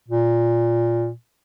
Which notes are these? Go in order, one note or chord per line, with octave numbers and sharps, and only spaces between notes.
A#2